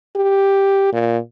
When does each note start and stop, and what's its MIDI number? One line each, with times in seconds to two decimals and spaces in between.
0.16 0.90 67
0.93 1.18 46